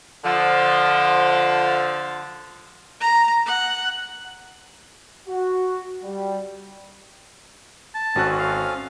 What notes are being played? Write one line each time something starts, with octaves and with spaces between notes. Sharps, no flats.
D3 F3
A#5
F#5
F#4
G3
A5
G#1 C4 C#4 F#4 A4 F#6
F5